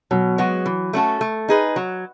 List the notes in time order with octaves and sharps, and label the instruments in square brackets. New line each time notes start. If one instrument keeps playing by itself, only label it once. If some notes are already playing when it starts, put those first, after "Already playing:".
[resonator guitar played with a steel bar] B2 [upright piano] F#3
[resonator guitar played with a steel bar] G#3 B3 F#4
E3
A3 C#4 F#4 A4
A3
D#4 G#4 B4
F#3